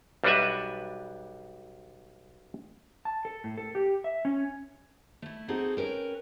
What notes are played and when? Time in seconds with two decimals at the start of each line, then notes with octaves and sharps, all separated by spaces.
0.24 B1 G3 D4 F#4 B4 E5
3.05 A5
3.25 A4
3.44 A2
3.58 A4
3.75 G4
4.04 E5
4.25 C#4
5.22 A3 E4
5.48 C4 D#4 F#4 G#4 A4
5.77 C#4 A#4 B4 G5